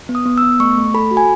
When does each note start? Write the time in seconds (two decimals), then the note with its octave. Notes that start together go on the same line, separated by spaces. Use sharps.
0.09 B3
0.15 D#6
0.26 B3
0.38 E6
0.43 B3
0.60 A3 C#6
0.77 A3
0.94 A4 B5
1.11 F#4
1.17 G#5